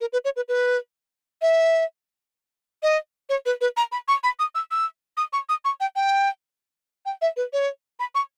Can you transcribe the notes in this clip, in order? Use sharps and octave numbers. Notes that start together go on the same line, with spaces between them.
A#4
B4
C#5
B4
B4
E5
D#5
C#5
B4
B4
A#5
B5
C#6
B5
D#6
E6
E6
D#6
C#6
D#6
C#6
G5
G5
G5
E5
B4
C#5
B5
C#6